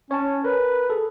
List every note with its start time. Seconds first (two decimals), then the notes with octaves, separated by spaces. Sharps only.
0.11 C#4 C#5 G#5 A5
0.44 A#4 B4
0.90 G#4 A4